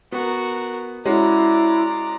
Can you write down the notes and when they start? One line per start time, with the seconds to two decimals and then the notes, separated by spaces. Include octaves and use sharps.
0.12 B3 F#4 A#4
1.06 G#3 C#4 E4 F#4 D5 A#5